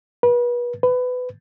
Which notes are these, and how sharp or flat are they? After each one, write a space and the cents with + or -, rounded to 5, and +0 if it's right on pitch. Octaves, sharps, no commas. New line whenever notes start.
B4 -35
B4 +20